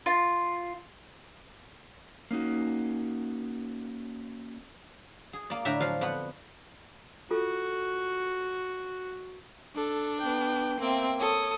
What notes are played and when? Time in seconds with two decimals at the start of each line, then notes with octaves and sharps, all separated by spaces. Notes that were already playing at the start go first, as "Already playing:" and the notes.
0.06 F4
2.31 A#3 C#4 D#4 F#4
5.33 G#4
5.50 A#3 D5
5.65 A2 D3 D5 E5 G5 A#5
5.80 F3 F#3 F5
6.01 F2 B3 F#5
7.31 F4 F#4 A4
9.75 D4 A4
10.21 B3 G5
10.80 A#3 C4 E5 G5
11.20 A4 C#5 D#6